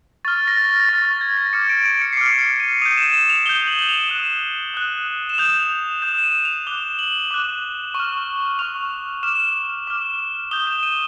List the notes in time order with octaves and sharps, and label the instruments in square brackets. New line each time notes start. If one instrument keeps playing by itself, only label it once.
[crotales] C#6 F6 A6
A#6
A6
A6
C#6 F6 A#6
A6
G#6
A#6
D6 F6 C#7
D7
D7
C#7
C7
D6 F6 C#7
C#7
D#7
D#6 G6 D#7
E7
E7
F7
D#6 G6 G7
F#7
F7
D#7
D#6 F#6 E7
D#6 F#6
E7
D#6 G6 F7
D#6 G6 E7
E7
D#7
F7
D6 F#6 G7
F#7
D6 F#6
C#6 F6
C#6 F6 F7
D6 F6 E7
D6 F6
D#6 G6 G7
E7
D#7